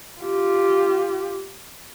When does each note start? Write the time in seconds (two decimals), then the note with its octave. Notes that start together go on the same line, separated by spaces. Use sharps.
0.22 F4 G4